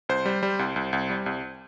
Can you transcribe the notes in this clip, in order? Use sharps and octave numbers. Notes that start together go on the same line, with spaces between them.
C2 C5
G3
G3
C2
C2
C2
G3
C2